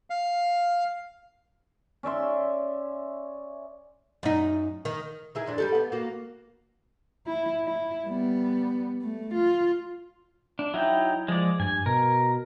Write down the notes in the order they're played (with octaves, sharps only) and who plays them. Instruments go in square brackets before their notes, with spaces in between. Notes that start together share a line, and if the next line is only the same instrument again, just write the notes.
[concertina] F5
[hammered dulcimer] C#4 D5 E5 C6
[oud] F#2 D#4
D#3
D#3 E4 G#4
F2 D#3 D4
G3 G4 A4
B3
A#3 F#4
[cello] E4
E4
G3 B3
A3
F4
[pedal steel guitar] D4
[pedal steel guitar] F#3 D#4 G5 [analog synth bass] E4
[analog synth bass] F3 [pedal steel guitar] G#3 D5
[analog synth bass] G2 [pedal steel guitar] G#5
[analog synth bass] B2 [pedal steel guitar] A#4